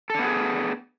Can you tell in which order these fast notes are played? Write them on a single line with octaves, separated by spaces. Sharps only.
A4 D4 B3 G#4